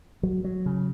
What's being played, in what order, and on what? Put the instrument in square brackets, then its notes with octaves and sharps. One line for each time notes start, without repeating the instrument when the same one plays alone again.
[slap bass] F#3
F#3
C#3